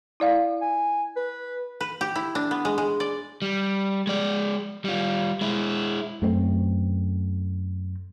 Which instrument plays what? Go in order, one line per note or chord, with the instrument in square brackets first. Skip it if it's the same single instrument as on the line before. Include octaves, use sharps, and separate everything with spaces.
[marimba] E4 D5 F5
[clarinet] G#5
B4
[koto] B4
G4
E4
D4
B3
G#3
G#3
D5
[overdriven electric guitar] G3
G#3 D5
G3 F4
G#3 E4
[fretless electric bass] F#2 A3 B3 C4